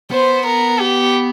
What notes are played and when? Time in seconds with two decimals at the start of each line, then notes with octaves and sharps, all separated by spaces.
0.11 B3 C5
0.46 A#4
0.80 G4